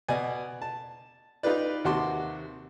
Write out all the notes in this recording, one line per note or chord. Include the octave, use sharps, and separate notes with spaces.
B2 D5 D#5 F#5 G#5
A5
D#4 F4 G4 B4 D5
D#2 C3 F#4 A5 C6 D6